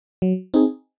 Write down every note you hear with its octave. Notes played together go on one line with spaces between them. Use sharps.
F#3
C4 D#4 G#4